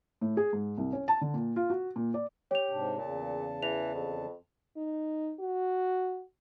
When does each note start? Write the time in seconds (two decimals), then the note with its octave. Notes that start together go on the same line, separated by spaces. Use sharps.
0.21 A2
0.37 G#4
0.53 G#2
0.78 C2
0.93 C#4
1.08 A5
1.21 D3
1.34 A#2
1.56 F4
1.70 F#4
1.96 A#2
2.14 D5
2.51 G4 C#5 F7
2.69 G#2 C3 D4
2.98 E2 A#2 C#3 A5
3.63 E3 F7
3.94 F2
4.77 D#4
5.40 F#4